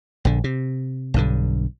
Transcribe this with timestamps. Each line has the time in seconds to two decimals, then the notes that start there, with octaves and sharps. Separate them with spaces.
0.25 A#1 D3
0.44 C3
1.14 B1 G2 D3